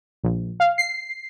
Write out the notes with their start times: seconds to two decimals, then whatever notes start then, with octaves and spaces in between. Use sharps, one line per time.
0.23 A#1
0.60 F5
0.78 C7